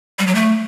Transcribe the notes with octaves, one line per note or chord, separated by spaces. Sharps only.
G3
F#3
A3